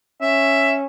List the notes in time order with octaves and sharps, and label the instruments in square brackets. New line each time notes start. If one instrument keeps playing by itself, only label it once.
[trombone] C#4 [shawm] E5